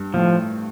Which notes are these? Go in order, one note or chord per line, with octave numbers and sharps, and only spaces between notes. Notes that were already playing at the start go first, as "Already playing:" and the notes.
Already playing: G2
A2 F3